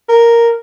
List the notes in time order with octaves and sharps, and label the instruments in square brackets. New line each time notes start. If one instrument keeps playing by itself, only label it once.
[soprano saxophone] A#4